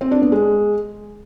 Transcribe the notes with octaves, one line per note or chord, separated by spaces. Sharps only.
C4
D4
B3
G#3